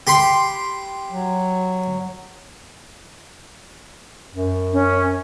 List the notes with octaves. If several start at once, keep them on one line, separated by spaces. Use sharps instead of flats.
G4 B5 C6
F#3
F#2
C#4